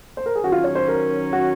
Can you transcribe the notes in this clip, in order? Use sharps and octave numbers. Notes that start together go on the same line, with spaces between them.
C5
A#4
G#4
D#3 F#3 C#4 F#4
F4
C#5
C5
A#4
F#4